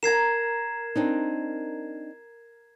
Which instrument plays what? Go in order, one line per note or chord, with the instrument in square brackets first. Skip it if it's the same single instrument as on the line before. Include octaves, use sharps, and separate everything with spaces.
[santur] A#4 A#5 [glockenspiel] G#6 C7 E7
[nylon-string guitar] C4 D4 D#4